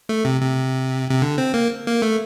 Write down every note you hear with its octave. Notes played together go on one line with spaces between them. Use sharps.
A3
C3
C3
C3
D3
C4
A#3
A#3
A3